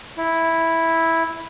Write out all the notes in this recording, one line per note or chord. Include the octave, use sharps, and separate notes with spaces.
E4